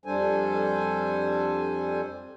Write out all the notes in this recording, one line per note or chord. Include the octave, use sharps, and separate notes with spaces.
F2 G3 D4 A4 C5 G#5